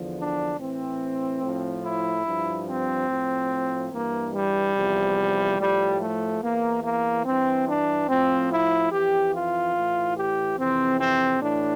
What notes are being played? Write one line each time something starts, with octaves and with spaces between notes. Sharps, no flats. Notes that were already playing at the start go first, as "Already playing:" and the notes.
Already playing: E2 D3 F3
D4
A2 E3 C4
A2 F3
E4
G2 F3
C4
A2 F3
G2 E3 A#3
G3
E2 C3 F3
A2 F3 G3
A3
E2 E3 A#3
A#3
G2 E3 C4
D4
A2 F3 C4
E4
F2 E3 G4
F4
A2 E3
G4
F2 C3 E3 C4
C4
A2 E3 D4